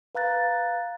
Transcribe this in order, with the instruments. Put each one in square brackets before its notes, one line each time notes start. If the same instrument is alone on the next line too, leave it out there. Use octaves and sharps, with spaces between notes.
[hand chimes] B4 F5 A#5 F#6 A6